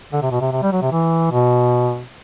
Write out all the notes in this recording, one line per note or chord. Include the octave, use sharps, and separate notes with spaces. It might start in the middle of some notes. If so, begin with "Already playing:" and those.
D3
C3
B2
C3
C3
G3
F#3
C3
E3
B2